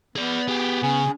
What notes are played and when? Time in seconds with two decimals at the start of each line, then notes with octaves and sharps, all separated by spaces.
0.16 B3 G#4 D5
0.48 G4 G#4
0.82 C#3 G#4